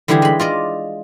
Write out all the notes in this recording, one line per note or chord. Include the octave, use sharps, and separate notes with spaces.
D3 E3 G3 E4 G4 G#4
G#3 B5
F4 D5 D#5